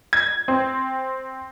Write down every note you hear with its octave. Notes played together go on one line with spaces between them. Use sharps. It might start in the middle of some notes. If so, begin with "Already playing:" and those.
G#6
C4